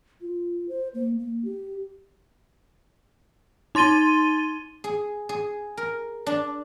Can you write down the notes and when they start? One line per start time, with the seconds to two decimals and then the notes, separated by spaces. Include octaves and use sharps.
0.21 F4
0.69 C5
0.94 A#3
1.19 A#3
1.45 G4
3.75 D#4 C6 A6 D#7 G7
4.84 G#4
5.29 G#4
5.77 A#4
6.26 D4